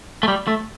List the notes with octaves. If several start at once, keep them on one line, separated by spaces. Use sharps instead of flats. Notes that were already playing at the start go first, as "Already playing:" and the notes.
A3
G3
A3